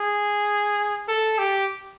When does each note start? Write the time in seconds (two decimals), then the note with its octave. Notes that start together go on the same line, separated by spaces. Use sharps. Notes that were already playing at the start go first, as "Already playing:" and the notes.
Already playing: G#4
1.08 A4
1.39 G4